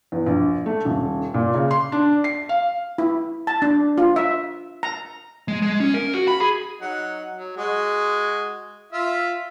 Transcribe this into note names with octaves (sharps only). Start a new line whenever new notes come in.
E2
A#1
A3
D#1
A#2
C#3
C6
D4
C7
F5
E4
A5
D4
F4
E5
A#5
G#3
G#3
C#4
A#4
F#4
B5
G#4
F#3 D#4 F#5
F#3
G#3 F#4 D#5
F4 E5